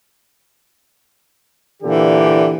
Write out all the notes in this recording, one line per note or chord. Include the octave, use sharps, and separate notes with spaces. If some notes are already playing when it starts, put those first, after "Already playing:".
A#2 D3 E3 G4